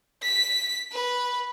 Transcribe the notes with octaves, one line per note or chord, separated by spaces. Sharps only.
B6
B4